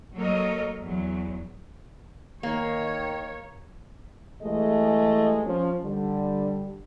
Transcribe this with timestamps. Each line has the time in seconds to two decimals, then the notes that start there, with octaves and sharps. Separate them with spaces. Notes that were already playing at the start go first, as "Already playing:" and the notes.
0.16 F#3 A#3 A4 A#4 C#5 D#5
0.81 E2 F#3
2.43 D#3 A#3 C#5
4.42 E3 G#3 A3 G4 G#4 D#5
5.46 F3 C#4
5.84 D3 G3